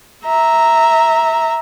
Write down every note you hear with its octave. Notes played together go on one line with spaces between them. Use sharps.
E5 A#5